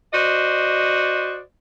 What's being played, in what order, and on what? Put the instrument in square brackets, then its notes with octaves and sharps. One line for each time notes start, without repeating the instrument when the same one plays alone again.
[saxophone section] F#4 C5 D5 D#5